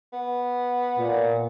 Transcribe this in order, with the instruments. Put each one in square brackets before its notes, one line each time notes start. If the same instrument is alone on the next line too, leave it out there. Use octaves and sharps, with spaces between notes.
[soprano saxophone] B3
[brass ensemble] A#2